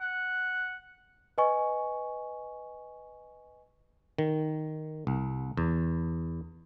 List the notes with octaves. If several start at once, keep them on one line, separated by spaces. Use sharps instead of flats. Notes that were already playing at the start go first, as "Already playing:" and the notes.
F#5
B4 D#5 G#5 C#6
D#3
C2
E2